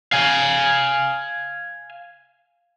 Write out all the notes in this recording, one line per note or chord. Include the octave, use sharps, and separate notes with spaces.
F5 G#5